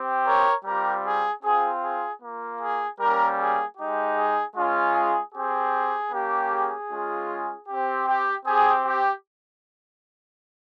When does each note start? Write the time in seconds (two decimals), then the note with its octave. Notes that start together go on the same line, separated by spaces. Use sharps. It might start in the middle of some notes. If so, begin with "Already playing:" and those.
Already playing: C4 G4
0.26 A#4 C#5
0.65 G3 C4 F4 G4 A#4
1.05 G#4
1.43 C4 F4 G#4
1.83 G#4
2.22 A#3 F4
2.61 G#4
2.99 G3 A#3 C#4 G4 A#4
3.38 G#4
3.77 G#3 D#4 G4
4.17 G#4
4.56 G#3 C#4 F4
4.95 G#4
5.34 C4 G4 G#4
6.12 A#3 C#4 G4
6.51 G#4
6.90 G#3 C#4 F4
7.68 C4 G4
8.08 G4
8.46 C4 G4 G#4
8.86 G4